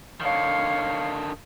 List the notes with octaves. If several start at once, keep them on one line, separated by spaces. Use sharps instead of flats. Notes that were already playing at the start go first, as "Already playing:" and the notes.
D3 D#3 C#5 F5